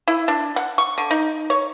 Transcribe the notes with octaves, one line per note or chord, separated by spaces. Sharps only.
E4
D4
F#5
C#6
D3
D#4
C#5